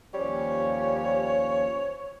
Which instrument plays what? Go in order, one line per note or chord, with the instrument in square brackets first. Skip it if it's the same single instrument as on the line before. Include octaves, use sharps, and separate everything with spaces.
[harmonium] D#2 F3 C#4 [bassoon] G3 [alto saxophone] C#5